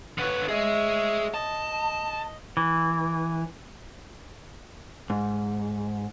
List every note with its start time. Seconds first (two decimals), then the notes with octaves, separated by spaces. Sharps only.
0.18 D3 B4 C#5 F#5
0.48 G#4 C#5 D#5 E5
1.34 D#5 A5
2.57 E3
5.10 G#2